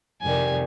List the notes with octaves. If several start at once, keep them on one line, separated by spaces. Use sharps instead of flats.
F2 C3 D#3 G3 G#5